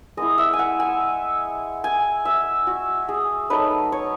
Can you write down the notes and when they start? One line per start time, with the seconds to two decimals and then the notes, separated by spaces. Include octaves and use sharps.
0.17 G#3 B3 E4 D#5
0.38 E5
0.53 G#5
0.59 F#5
0.80 G#5
1.84 G#5
2.25 E5
2.67 F#4
3.09 G#4
3.50 F#3 A3 D#4 B4
3.92 C#5